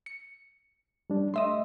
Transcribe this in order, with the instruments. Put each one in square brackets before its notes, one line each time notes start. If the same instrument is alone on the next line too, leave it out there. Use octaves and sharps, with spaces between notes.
[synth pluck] C#7
[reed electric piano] G3 D4
[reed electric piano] A3 [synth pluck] D#5 E5 C6